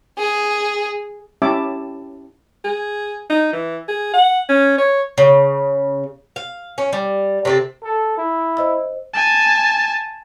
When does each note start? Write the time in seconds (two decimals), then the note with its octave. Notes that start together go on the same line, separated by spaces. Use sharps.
0.18 G#4
1.42 C#4 E4 G4 E5 A5 D6
2.65 G#4
3.30 D#4
3.53 E3
3.88 G#4
4.14 F#5
4.49 C#4
4.78 C#5
5.18 C#3
6.36 F5
6.78 C#4
6.93 G3
7.45 C3 C4 A4
7.84 A4
8.18 E4
8.57 C5 D#5 E6
9.14 G#5 A5